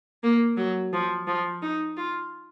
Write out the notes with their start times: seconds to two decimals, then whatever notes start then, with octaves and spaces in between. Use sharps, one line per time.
0.23 A#3
0.57 F#3
0.93 F3
1.27 F3
1.62 D#4
1.97 F4